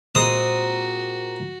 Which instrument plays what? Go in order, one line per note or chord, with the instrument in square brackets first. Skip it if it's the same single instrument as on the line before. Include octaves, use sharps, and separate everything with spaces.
[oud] A#2 G#3 C4 [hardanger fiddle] F#4 [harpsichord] D#6